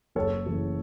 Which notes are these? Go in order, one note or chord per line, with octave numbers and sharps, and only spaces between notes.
F#1 A4 C#5
F#2 C#3 E3 A3